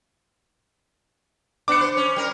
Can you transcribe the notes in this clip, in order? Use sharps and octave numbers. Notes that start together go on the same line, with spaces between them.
B3 D4 D6 C#7
C5
C#4
G3 A#4